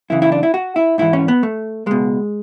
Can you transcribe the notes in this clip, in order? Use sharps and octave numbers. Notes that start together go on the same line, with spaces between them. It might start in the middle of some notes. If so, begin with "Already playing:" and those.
F#2 C#3 E3 E4
E4
D4
E4
F#4
E4
G#2 E3 E4
C#4
B3
A3
C#2 B2 G#3